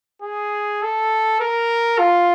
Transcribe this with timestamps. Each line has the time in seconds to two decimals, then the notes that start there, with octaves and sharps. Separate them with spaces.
0.22 G#4
0.82 A4
1.40 A#4
1.99 F4